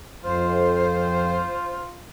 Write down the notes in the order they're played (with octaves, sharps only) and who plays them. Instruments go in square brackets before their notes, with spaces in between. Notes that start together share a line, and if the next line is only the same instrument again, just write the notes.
[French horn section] F2 [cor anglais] F4 [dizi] C5